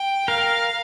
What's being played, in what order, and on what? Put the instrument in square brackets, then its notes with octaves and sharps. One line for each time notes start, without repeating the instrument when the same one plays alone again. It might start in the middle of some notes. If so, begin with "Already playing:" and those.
Already playing: [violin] G5
[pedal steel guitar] A#4 [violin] F5